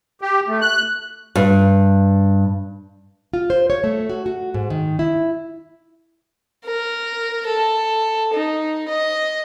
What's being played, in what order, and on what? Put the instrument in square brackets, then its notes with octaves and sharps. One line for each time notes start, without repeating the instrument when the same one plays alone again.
[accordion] G4
A3
F#6
[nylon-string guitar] G2
F4
C5
C#5
A3
F#4
F#4
G#2
D#3
E4
[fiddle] A#4
A4
D#4
D#5